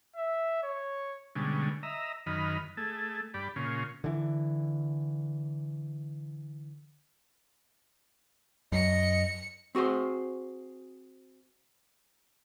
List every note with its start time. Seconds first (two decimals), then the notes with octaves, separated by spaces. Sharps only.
0.16 E5
0.63 C#5
1.35 B2 D3 G3 G#3 C#4
1.83 D#5 E5 A#5
2.26 F#2 D#3 D#5 B5 F6
2.77 A3 G#4 A4
3.34 G2 G4 D5 B5
3.56 A#2 C#3 C#4 F4
4.04 D3 E3
8.72 F#2 D#5 C#7
9.75 C4 F#4 G#4 C5